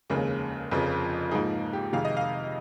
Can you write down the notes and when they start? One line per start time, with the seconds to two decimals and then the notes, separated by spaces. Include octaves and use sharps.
0.10 F1 D#2 C#3 G#3
0.71 F1 F2 C#3 F3
1.31 G#2 F3 A#3 D#4 G#4
1.52 F4
1.73 G4
1.93 F2 C3 D#3 G#3 F5
2.05 D#5
2.17 F5